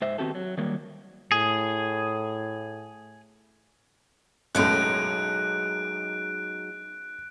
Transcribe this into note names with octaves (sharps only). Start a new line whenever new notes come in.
G#2 C5 E5
D#3 B3 C4 F#4 G4 A4
F#3
D#3 F#3 G3 A#3
A2 G#4
B1 F#2 A2 F#3 G#3 D#4 F#6 D7